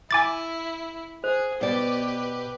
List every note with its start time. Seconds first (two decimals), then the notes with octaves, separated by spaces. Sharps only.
0.11 E4 G#5 D6 A6
1.24 G#4 C5
1.61 B2 G4 B4 D5